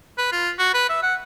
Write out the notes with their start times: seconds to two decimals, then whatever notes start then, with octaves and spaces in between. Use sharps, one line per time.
0.18 B4
0.32 F4
0.59 F#4
0.74 B4
0.90 E5
1.03 F#5